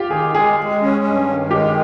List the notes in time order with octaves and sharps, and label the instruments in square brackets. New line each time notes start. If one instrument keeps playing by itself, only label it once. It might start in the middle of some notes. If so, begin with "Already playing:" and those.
Already playing: [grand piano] F4 G4
[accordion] D#3 [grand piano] G#4
[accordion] G#3 [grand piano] G#4
[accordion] G#3
C#4
G2
D#3
[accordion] G#3 [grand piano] G4